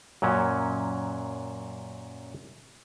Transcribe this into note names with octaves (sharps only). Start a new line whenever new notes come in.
F#2 A#2 F#3 C#4